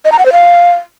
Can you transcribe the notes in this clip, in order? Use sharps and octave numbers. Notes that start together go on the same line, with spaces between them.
D#5
A#5
F#5
C5
F5